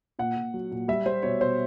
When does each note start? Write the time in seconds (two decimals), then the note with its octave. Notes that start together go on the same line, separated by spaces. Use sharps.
0.19 A#2 F#5
0.37 A#2
0.54 F#3
0.71 A#2
0.88 G3 E5
1.06 G3 C5
1.23 B2 C#5
1.41 B2 C5